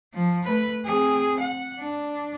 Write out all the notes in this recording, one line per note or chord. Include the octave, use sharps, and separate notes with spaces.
F3
A3 B4
C4 G#4
F#5
D4